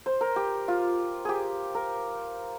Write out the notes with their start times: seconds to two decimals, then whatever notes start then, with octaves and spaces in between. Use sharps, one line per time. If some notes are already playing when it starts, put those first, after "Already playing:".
0.06 C5
0.21 A#4
0.36 G4
0.68 F4
1.25 G4 G#4
1.75 A#4